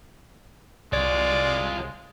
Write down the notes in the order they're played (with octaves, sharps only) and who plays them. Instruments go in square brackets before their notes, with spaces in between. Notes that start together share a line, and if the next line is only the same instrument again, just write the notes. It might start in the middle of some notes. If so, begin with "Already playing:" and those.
[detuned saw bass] C2 [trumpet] G#3 [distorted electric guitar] F4 C#5 [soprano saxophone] D5